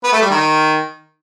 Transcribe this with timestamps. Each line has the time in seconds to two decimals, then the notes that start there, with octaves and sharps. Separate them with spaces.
0.03 B3
0.13 A3
0.22 G3
0.31 D#3